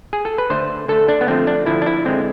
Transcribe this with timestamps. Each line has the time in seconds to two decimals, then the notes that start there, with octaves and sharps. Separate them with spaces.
0.13 G#4
0.25 A4
0.38 B4
0.50 D3 A3 C5
0.88 D3 A3 A4
1.08 D4
1.21 B3
1.28 D3 F3 A3 C4
1.47 D4
1.66 D3 F3 A3 E4
1.82 D4
1.86 E4
2.05 D3 G#3 C4